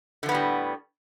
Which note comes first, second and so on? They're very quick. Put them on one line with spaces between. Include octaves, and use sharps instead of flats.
D3 F3 B3 A2 G3